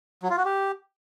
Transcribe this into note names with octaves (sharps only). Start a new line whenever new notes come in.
F#3
F4
F#4
G4